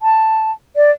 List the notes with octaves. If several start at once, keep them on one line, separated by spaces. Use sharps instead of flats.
A5
D5